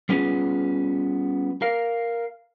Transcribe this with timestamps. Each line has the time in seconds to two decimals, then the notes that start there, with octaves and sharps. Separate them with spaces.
0.09 G3 B3 C#4 F4 G#4
1.62 A#4 F5